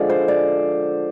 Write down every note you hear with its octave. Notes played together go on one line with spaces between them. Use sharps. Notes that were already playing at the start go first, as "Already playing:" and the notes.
Already playing: D3 F3 G#3 D5
C5
D5